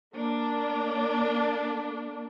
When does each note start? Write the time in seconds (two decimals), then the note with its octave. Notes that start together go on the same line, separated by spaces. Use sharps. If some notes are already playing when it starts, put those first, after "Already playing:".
0.13 A#3 D4